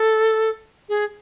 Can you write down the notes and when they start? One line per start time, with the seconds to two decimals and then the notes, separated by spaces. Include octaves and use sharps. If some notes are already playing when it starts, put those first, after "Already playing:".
Already playing: A4
0.89 G#4